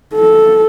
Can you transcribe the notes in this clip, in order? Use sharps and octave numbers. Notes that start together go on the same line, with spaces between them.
A4